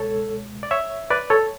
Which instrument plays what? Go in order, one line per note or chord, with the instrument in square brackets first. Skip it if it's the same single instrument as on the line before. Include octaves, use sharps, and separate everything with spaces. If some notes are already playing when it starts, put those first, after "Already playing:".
Already playing: [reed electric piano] C#2 B2 G#3 A4 C#5
D5
C#5 E5
B4 D5
A4 C#5